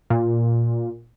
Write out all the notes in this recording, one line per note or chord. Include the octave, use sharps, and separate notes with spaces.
A#2